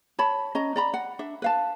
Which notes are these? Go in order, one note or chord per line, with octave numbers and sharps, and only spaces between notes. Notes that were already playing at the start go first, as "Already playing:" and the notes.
C#5 A5 B5
C#4 D#5 A#5
D5 A#5 B5
F#5
D4 E5
B4 F5 A5